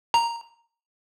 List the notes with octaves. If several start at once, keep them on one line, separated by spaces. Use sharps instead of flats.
A#5